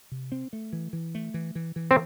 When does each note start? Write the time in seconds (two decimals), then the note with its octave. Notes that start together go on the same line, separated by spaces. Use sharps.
0.11 C3
0.32 C4
0.53 A3
0.73 E3
0.93 E3
1.15 A3
1.34 E3
1.55 E3
1.76 E3
1.91 C4